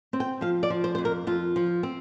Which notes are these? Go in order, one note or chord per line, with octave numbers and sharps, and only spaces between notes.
C4
G5
F3 F5
D5
F3
C5
F2 C5
A#4
F2 F4
F3
C4